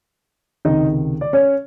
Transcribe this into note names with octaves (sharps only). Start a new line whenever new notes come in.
C#2 C3 D#3 D#4 D#5
D5
C#4 C#5